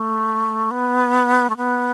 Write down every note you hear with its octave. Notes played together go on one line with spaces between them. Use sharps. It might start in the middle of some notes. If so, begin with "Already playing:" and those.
Already playing: A3
B3
A3
B3